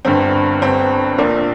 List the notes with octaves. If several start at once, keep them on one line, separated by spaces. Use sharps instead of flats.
G1 G2 D3 C4
G1 G2 D3 C4
A#1 A#2 A#3 D4